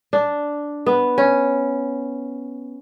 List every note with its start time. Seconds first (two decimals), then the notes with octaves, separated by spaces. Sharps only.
0.13 D4
0.86 B3
1.18 C#4